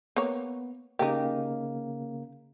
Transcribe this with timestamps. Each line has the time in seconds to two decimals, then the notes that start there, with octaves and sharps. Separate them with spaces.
0.16 A#3 B3 C#5
0.99 C#3 A#3 D#4 G4